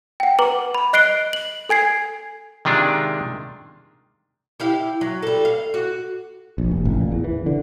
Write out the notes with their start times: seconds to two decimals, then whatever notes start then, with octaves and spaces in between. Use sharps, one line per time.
0.20 F#5 G5
0.39 B4 A#5 D6 F#7
0.75 B5
0.93 D#5 F#6 C7 D7 G7
1.33 F#7
1.69 A4 G#5 G#6 C7
2.65 C3 D#3 G#3 D4 F4
4.60 E4 G4 F5
5.01 F#3
5.23 G3 A4
5.45 F5
5.74 F#4
6.58 A#1
6.71 F1
6.85 A1
7.00 A#2
7.12 E2
7.24 E3
7.46 D3